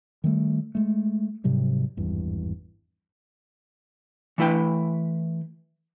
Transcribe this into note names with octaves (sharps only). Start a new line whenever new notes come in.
D#3 G3 A3
G#3 A3
G#2 C3 F#3 G3
G#1 E2 G2
E3 A3 E4 B4 G5